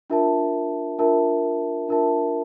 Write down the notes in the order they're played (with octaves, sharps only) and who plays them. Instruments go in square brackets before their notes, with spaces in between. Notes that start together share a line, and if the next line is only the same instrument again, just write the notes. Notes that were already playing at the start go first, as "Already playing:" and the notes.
[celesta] D4 F4 A#4 E5 A5
D4 F4 A#4 E5 A5
D4 F4 A#4 E5 A5